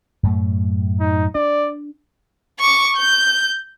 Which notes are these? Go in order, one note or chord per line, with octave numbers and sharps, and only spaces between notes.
F#2 A2 A3
D#4
D4 D5
C#6 D6
G6